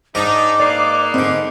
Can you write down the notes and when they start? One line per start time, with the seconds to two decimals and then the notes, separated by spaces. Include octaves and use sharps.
0.15 G#2 D4 D#4 A#4 D6
0.60 A#3 D#4 B4 D5
1.14 G#2 D3 C4